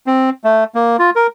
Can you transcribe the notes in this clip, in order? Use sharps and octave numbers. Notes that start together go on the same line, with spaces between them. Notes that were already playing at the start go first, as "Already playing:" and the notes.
C4
A3
A#3
F4
A#4